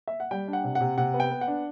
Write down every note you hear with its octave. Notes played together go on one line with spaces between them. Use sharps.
E5
F#5
G3 G5
D4
F#5
C3
F#5
C3
C3 F#5
B3
G5
B3
F#5
D4